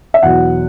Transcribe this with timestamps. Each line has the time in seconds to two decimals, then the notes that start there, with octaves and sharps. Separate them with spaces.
0.14 E5
0.23 E2 B2 F#3 F#5